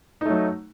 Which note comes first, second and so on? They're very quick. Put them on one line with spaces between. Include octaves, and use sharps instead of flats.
D#4 A3 F#3